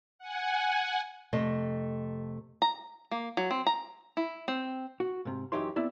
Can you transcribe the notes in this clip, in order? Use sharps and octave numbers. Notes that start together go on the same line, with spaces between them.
F#5 G#5
F2 C3 A3 D#5
A#5
A#3
F#3
C4
A#5
E4
C4
F#4
G#2 C3
F#2 E3 D#4 G4 C#5 C6
B3 C4 E4 D5